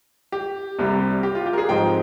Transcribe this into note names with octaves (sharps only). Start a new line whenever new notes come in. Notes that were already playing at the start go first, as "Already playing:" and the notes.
G4
C2 C3 G3
G4
F4
G4
A#4
G#4
G#2 F3 C4 D#4 G5